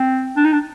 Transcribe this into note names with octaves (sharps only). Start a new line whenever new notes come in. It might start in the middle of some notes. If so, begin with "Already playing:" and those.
Already playing: C4
D4
D#4
D4